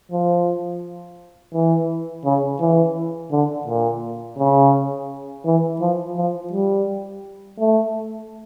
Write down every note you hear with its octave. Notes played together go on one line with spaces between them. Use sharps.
F3
E3
C#3
E3
D3
A#2
C#3
E3
F3
F3
G3
A3